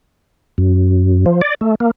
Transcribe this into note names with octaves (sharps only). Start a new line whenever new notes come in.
F#2
F3
D5
A3
A#3